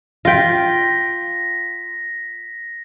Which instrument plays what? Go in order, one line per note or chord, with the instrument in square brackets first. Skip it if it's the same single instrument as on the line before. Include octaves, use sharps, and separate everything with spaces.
[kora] F4 G5 [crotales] A#6 B6